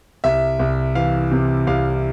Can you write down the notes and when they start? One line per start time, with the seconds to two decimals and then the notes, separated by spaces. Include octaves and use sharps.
0.24 C2 E5
0.59 C2
0.95 E3 F5
1.32 C3
1.67 C2 F5